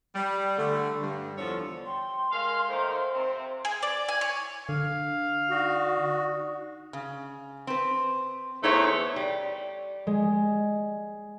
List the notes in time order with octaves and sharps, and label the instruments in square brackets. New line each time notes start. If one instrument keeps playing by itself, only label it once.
[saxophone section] G3
D3 A3
G2
E2 D3 F3 D4 A4 C#5
[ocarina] G5 [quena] C6
[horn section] G#3 F5 [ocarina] A#4
[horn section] D#3 A3 A#3 [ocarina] C5
[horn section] C3 C4
[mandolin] G#4
D5
G#5
C#5
[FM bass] D3 [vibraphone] D4 [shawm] F5
[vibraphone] D#4 D5 D#6 [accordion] F#4
[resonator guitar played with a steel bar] C#3
C4 B4
[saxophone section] E2 A3 C#5 [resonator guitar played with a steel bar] D#4 C5 E5
[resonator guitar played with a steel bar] G3
[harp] G#3